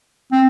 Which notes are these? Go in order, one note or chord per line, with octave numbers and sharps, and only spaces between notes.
C4